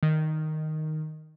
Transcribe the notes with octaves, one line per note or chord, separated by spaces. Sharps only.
D#3